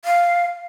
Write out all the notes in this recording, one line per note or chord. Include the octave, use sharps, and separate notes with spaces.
F5